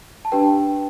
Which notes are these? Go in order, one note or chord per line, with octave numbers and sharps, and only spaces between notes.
A5
D4 G4 B4 G5